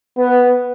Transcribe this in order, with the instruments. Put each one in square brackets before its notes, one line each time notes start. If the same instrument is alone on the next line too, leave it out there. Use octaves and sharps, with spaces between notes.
[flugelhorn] B3